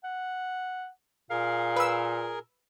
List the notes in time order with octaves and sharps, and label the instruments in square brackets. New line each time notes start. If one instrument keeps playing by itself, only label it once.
[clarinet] F#5
[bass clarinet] A#2 [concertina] G#4 A#4 [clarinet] F5
[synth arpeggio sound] B4 E6